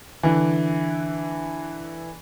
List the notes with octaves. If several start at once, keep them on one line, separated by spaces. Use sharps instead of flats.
D3 E3